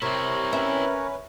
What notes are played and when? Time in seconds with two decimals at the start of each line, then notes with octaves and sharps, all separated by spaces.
0.02 C3 C4 E4 A#4 C#5
0.53 C#4 B4 E5